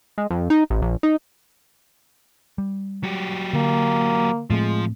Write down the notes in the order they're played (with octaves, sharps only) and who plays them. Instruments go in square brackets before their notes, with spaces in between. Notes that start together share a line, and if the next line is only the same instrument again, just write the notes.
[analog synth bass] G#3
F2
D#4
A1
A#1
D#4
[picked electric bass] G3
[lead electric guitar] F#3 G4
[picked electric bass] D3 [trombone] A#3
[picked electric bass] A2 A3 C4 [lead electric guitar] F3 [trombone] G#3